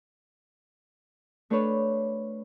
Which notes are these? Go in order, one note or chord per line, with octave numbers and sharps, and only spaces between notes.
A3 D4 A4 B4 C#5